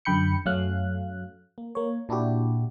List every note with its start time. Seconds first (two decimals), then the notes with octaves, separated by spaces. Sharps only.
0.05 F#2 D3 G5 B5 G6 C#7
0.46 F#2 F#3 A3 C#4 F5 F#6
1.58 A#3
1.75 A#3 C#5
2.09 A#2 D4 E4 F#4 G4